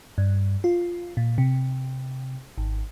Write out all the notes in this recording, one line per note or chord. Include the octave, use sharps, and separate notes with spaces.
G2
F4
A#2
C3
G#1